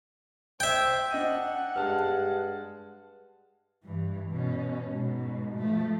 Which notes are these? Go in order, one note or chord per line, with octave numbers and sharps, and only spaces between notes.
C5 E5 G5 G#6
D4 D#5 F#5 D#7
G2 G#3 A5 F6
G2 E3
B2 C#4
G#2 B2
F3 A3